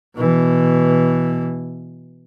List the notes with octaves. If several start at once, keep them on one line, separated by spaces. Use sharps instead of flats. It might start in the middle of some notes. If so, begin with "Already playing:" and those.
B2 E3